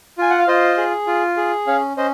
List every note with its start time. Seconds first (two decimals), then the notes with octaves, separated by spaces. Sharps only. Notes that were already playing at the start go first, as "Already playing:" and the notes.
0.18 F4 G#5
0.30 F#5
0.39 F5
0.48 F4 C5 D#5
0.77 G#4
1.07 F4
1.37 G#4
1.67 C#4 C#5 F5
1.97 C#4 C5 D#5